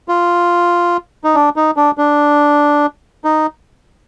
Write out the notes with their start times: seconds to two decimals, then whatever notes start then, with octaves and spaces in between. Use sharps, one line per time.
0.08 F4
1.24 D#4
1.35 D4
1.56 D#4
1.77 D4
1.98 D4
3.24 D#4